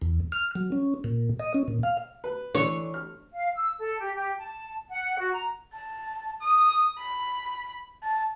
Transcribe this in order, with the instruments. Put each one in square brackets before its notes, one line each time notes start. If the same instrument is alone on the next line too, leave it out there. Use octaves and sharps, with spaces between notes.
[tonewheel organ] E2
F6
F#3
C#4
A#2
D#5
C#4
A#2
F5
[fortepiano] B4
[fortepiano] E3 D4 [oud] C#5
[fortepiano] F6
[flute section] F5
E6
A4
G4
G4
A5
F#5
F#4
A#5
[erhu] A5
D#6
B5
A5